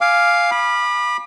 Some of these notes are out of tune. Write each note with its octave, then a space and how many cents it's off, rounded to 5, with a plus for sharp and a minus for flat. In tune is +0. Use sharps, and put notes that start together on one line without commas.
F5 +0 G#5 +0 D6 +0
B5 -15 D6 +35